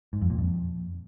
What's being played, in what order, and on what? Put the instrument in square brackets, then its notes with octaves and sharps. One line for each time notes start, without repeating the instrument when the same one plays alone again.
[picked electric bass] G#2
F2
A#2
F2